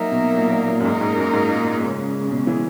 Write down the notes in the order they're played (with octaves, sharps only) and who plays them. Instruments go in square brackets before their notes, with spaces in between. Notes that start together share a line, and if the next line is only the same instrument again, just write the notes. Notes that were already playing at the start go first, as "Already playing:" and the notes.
Already playing: [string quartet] F#3 A#3 D#4 A#4 E5
[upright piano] B2
A#2
A#2
A#2
F#2
[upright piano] G#2 [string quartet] A#3 D#4 A#4
[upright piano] G#2
F#2
G#2
A#2
[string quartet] C#3 G#3 C#4
[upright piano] B2
E3